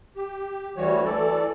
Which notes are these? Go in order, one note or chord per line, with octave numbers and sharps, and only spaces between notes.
G4
D2 E3 G3 F#4 C#5
E3 A4 D5